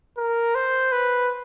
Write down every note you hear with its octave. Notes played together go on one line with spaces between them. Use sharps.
A#4
C5
B4